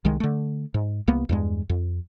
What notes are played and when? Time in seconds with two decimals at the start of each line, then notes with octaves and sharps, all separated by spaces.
0.05 C2 D#3 G#3
0.20 D3 A3
0.74 G#2
1.08 C2 A#3 B3
1.29 E2 G2 G#3
1.69 F2